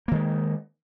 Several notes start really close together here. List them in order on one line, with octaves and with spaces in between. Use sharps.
A#3 D#3 G#3